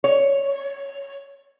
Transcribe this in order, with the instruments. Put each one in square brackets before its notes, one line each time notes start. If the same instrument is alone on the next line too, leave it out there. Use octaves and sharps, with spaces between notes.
[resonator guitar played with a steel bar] C#5